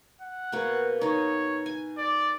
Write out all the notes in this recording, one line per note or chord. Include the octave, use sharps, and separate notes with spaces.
F#5
B2 A#3 C#5
D#4 C#5 D#5
G#5
D5